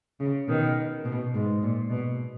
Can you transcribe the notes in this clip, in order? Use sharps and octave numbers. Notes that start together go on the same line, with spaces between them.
C#3
B2 D#3
B2
G#2
A#2
B2